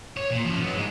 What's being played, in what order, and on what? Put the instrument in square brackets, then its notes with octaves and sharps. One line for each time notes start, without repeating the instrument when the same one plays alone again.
[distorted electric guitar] C#5
A#2
F3 C#4
F#3 B3
G#2 G#3